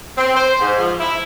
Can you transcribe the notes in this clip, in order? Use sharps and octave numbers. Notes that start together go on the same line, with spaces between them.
C4
C5
G#2
F3
E4